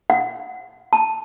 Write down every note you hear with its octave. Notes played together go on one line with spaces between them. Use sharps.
F#5
A5